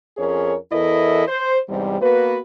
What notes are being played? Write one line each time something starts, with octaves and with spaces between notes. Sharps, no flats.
F2 C#4 G#4 A#4 C#5
E2 E3 E4 A4 A#4 D#5
C5
E2 G#2 C3 G3
A#3 B3 F#4 B4